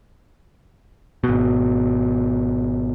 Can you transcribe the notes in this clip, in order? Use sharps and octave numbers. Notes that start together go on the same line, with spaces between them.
G#1 B2